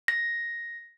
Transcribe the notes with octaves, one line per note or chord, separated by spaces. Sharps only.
A#6